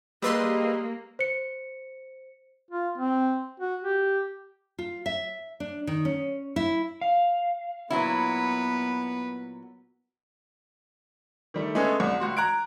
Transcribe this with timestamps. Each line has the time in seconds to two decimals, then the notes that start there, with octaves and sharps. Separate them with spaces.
0.22 G3 A#3 G4 G#4 B4 D#5 C6 E6
1.19 C5 C#7
2.71 F4
2.98 C4
3.60 F#4
3.83 G4
4.79 F4
5.06 E5
5.60 D4
5.87 D#3
6.05 C#4
6.56 E4
7.01 F5
7.90 A#2 F#3 B3 E4 B4
11.54 D#3 G3 A3
11.75 G#3 A3 B3 C#4 G#4 A4
12.00 C2
12.20 C#2 F#4 C6
12.37 A#5 F#6 G#6 D7